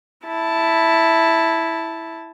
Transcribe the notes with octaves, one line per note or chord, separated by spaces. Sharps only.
E4 A5